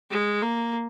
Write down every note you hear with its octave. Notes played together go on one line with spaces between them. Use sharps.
G#3
A#3